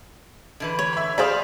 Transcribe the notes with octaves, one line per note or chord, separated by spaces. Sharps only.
D3 E3 B4
C#5
E5 B5
G#4 C5 D5 F5 B5 D#6